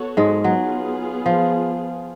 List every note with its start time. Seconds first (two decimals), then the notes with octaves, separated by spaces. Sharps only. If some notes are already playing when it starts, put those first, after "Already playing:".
Already playing: B3 F#4 A4 C#5
0.17 G#2 G#3
0.44 F#3 B3 F4 G#4
1.26 F3